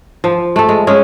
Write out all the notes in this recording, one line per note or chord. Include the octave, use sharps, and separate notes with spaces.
F3
A3 A4
G#3
G#3 C#4 G#4